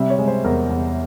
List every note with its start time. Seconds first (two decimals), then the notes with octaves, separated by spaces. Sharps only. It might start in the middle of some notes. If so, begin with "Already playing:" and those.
Already playing: C3 G3 E5
0.10 C#5
0.19 G#3
0.28 C5
0.44 E2 A#4
0.70 E2